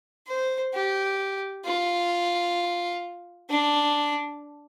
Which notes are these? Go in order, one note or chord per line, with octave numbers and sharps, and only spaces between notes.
C5
G4
F4
D4